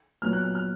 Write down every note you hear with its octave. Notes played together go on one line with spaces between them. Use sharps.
A#2 F#3 B3 F6
F#6
F6
F6